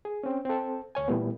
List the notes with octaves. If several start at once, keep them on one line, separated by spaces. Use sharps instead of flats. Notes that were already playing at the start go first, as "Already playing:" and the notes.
G#4
C4 C#4
C4 A4
D2 C#5 G#5
A#2 E3 G3 A3 B3